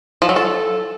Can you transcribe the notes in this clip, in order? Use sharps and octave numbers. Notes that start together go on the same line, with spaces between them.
F3
F#3
A4